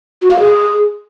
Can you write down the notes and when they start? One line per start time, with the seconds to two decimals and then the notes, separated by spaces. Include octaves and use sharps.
0.22 F#4
0.31 F5
0.40 G#4